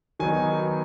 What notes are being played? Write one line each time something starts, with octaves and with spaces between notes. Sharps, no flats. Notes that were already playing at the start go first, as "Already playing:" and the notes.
D#3 F#3 B3 D#4 G#5